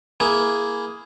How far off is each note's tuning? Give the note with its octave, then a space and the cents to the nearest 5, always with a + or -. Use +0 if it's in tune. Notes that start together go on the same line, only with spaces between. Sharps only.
A#3 +0 E4 +0 G#4 +0